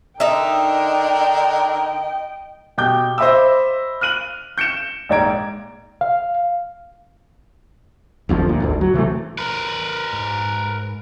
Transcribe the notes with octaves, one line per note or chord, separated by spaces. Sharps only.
D3 D4 D#4 A#4 D#5 E5 G5
B2 G4 G5 D6 G6
C5 D#5 E5 B5 D6 E6
F6 F#6 D#7 F#7
G6 C#7 D7 E7
A#1 G#2 D5 A#5 G#6 D7
F5
G1 F2 B2 F3
D2 A#2
G1 D2 G#2
F#3
C3 E3 F#3 A3
A#4 B4
G#2